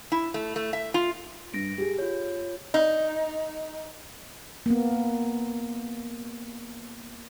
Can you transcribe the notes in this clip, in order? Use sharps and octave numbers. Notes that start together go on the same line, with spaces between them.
E4
A3
A3
E5
F4
G2 A#6 D7
G4 G#4
F4 C#5
D#4
A#3 B3